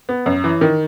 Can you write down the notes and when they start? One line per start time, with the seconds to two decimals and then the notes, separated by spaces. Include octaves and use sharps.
0.09 B3
0.26 F#2
0.44 E3
0.61 D#3